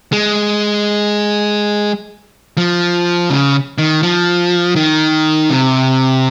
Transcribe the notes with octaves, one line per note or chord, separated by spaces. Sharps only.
G#3
F3
C#3
D#3
F3
D#3
C3